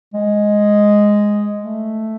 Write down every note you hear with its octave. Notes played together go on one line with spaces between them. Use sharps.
G#3
A3